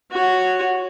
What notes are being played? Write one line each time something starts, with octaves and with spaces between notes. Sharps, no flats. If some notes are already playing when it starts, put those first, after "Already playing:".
F#4 C#5